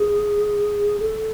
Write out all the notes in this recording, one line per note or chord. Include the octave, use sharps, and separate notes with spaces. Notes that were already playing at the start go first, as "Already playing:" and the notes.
Already playing: G#4
A4